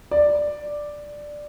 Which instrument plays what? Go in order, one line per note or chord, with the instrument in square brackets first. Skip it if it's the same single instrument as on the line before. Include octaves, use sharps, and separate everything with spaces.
[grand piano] D5